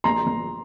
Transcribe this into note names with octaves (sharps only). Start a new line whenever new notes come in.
A#1 A#5 C6
A#1